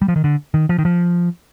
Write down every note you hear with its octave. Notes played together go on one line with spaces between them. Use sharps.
G3
F3
D#3
D3
D#3
F3
D#3
F3